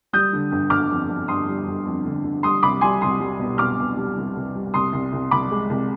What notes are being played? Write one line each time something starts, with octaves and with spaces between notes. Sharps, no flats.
G3 D#6 G6
D3
G1
G1 D6 F6
F2
F2
G1 C6 D#6
G3
G1
F2
D3
D3
G3 C6 D#6
C2 B5 D6
G3 G#5 C6
C2 C6 D#6
G3
B2
B2 D6 F6
B2
G3
C2
C2
G3
C2 C6 D#6
C2
C2
C2 B5 D6
G#3
C2